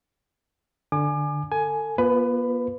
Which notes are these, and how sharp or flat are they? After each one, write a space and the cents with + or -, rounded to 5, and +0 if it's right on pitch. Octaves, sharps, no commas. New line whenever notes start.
D3 +5 G#5 +10 D6 +35
A4 +30 G#5 +15
B3 -45 F4 +0 B4 +15